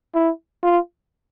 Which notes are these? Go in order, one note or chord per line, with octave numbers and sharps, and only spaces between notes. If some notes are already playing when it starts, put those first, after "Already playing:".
E4
F4